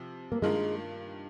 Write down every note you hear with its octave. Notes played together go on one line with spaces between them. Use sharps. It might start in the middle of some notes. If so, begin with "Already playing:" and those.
Already playing: C3 F3
A#3
G2 D#3 G#3 A#3 F4 A#4